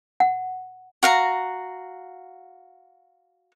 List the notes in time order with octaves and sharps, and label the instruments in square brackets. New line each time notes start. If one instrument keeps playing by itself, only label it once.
[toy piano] F#5
[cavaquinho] F#4 F5 A#5